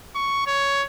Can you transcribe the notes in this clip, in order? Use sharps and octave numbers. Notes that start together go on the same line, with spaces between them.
C#6
C#5